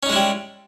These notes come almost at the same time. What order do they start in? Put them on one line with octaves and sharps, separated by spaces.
C#4 D#4 G#3 E4 G3